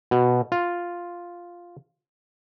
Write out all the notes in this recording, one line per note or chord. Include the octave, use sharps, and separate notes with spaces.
B2
F4